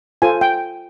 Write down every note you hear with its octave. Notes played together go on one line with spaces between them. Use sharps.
F4 A4 C5 G#5
G5